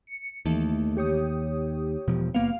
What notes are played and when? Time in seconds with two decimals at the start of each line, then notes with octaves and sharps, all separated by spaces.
0.07 C#7
0.46 D#2 D#3 E3 A3
0.97 G4 C#5 D#6
2.08 E1 B2 F3
2.34 F#1 A#3 B3 F5